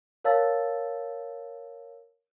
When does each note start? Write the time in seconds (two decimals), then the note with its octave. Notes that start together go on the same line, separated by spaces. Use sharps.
0.24 A#4 C#5 F5 A5 E6 A6